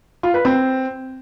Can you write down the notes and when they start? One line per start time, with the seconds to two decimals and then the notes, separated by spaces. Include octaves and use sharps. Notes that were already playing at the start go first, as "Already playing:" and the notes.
0.23 F4
0.34 B4
0.45 C4